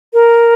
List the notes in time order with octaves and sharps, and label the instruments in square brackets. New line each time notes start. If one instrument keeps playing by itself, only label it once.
[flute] A#4